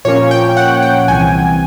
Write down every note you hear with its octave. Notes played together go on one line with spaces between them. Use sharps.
A#2 F3 A#3 C#4 C#5
G5
F#5
G5
C2 C3 E3 G#5